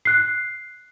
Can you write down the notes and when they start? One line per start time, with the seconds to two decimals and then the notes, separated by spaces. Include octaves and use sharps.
0.05 F#6 C7